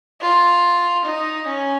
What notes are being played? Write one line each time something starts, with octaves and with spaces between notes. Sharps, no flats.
F4
D#4
C#4